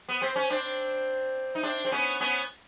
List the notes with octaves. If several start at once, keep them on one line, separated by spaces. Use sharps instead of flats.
B3
C4
C#4
C4 D4
D#4
C4 D4
C4
B3 C#4
B3 C#4